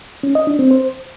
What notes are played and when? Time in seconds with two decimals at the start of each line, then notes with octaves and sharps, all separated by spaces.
0.23 C#4
0.35 D#5
0.47 D4
0.59 C4
0.71 C5